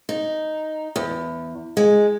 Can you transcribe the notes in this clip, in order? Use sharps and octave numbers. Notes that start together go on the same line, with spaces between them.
D#4
E2
G#3